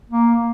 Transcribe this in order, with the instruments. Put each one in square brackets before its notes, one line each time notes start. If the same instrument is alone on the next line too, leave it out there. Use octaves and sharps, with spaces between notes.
[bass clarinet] A#3